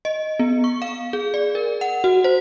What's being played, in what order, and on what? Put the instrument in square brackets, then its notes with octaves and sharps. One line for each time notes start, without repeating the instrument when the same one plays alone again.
[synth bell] D#5
B3
C#6
F5
G#4
D5
A#4
F#5
F#4
C5